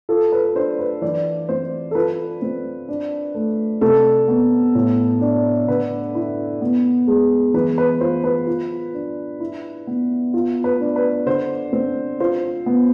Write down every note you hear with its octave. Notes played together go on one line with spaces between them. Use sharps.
F4 A4
B4
D4 C5
B4
E3 D5
C4 C5
A4
F4 B4
C4
D4
A3
C3 A4
B3
A2
D4
D3 B4
E4
B3
G#3
E3 B4
B4
F4 C5
B4
F4
D4
E4
B3
F4
B4
D4
B4
D3 C5
C4
F4 C5
B3